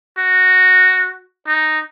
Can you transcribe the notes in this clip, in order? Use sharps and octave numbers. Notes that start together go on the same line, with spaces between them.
F#4
D#4